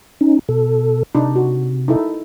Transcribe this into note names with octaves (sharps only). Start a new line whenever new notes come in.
C#4 D#4
B2 A4
C3 D4 D#4
F#4
D#4 E4 A4